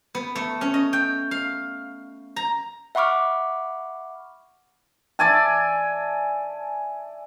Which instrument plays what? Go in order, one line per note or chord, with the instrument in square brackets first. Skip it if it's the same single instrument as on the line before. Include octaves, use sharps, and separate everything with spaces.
[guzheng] B3
A3
C#4
D#5
G5
F5
A#5
[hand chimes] E5 F#5 B5 C#6 D6 F6
[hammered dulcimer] D5 E5 G#5 A5